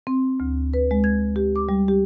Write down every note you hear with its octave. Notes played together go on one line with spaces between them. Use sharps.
C4
D2
B4
G#3
G#6
G4
D6
G3
G4